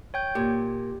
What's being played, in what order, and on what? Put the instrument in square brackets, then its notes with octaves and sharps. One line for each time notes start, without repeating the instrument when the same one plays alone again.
[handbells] C#5 G5 G6
[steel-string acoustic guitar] A#2 [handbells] G4